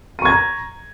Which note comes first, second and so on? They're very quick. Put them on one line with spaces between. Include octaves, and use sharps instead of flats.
D#7 C#6 G#6 A#5